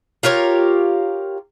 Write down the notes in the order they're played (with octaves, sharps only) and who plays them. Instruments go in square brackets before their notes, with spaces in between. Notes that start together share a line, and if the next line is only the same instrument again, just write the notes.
[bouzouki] F4 G4 A#4 C#5